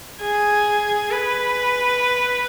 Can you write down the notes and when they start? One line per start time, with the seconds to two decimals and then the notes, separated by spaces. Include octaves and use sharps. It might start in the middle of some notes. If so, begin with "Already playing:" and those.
0.22 G#4
1.11 B4